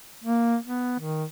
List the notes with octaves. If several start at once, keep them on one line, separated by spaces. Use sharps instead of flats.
A#3
B3
D#3